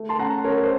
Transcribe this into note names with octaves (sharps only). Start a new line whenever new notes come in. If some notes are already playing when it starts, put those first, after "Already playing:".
Already playing: A3
A5 C6
C#4 F#5 A#5
C#4 A#4 C#5
C5